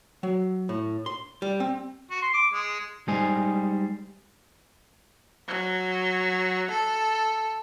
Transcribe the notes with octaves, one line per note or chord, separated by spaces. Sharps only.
F#3
A2
C6
G3
C4
F#4
C6
D6
G#3
G3 G#3 D#4 C5 G#5
F#3
A4